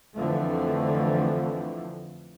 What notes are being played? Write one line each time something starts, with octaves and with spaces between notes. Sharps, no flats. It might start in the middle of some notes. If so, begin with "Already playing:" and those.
F2 D3 E3 F3 A3